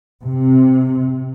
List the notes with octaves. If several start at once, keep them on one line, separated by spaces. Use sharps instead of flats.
C3